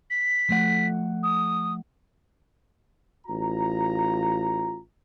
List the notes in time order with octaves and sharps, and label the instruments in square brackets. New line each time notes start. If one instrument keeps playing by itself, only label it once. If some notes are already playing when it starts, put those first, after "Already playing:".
[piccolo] B6
[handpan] F3 A3 F#5
[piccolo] D#6
[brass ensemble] A1 F4 A#5